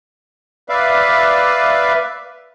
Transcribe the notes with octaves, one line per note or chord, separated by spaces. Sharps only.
B4 D5 E5 F5